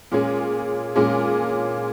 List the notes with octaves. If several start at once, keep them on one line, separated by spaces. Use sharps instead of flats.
A#2 G#3 C#4 G#4
A#2 G#3 C#4 G#4